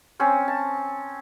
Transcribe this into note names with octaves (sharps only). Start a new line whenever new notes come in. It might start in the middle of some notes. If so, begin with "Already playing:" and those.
C4 C#4 C5
A5